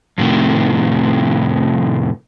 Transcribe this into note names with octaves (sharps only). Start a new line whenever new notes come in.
F2 A2 C3 D#3